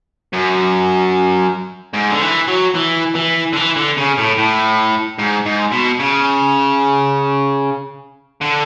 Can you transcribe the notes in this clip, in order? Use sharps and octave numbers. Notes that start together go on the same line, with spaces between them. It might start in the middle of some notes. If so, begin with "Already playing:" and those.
F#2
G#2
D3
E3
F#3
E3
E3
D3
E3
D3
C#3
A2
A2
G#2
G#2
B2
C#3
D3